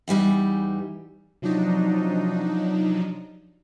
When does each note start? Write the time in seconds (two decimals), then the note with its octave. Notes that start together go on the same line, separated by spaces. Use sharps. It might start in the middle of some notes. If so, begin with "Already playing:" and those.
0.08 E2 E3 G3 D#4
1.42 C3 F3 F#3 D4 D#4